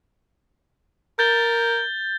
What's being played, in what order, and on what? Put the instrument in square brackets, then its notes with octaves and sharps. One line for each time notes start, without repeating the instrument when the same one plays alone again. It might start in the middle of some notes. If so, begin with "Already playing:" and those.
[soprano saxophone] A#4 [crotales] G6 A6 G7